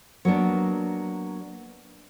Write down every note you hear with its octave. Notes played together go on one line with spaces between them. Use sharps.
F#3 A#3 B3 D4